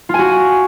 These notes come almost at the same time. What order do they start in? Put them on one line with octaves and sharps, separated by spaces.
F4 G#5 F#4